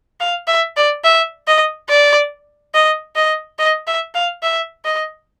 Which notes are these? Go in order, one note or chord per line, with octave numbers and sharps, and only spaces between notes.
F5
E5
D5
E5
D#5
D5
D#5
D#5
D#5
E5
F5
E5
D#5